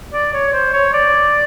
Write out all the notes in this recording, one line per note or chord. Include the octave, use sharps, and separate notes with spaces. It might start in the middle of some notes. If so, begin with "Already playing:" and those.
D5
C#5
C5
C#5
D5